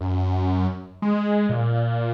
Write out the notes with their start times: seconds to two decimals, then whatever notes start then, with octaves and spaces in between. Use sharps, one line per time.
0.01 F#2
1.02 G#3
1.49 A#2